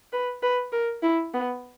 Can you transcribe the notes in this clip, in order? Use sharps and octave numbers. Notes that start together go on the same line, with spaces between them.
B4
B4
A#4
E4
B3